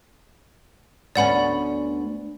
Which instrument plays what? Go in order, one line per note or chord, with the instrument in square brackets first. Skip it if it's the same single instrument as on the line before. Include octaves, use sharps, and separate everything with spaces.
[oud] D2 B3 C#4 [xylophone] D5 F#5 B5